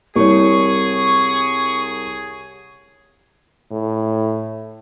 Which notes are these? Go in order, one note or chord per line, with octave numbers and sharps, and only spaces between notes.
C2 G4 G#4 C#5 C#6
A2